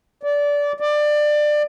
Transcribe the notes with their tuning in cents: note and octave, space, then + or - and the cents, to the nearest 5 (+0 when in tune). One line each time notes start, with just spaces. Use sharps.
D5 -20
D5 +20